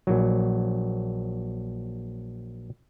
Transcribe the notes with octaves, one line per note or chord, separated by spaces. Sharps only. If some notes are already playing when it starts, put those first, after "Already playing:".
A#1 F#3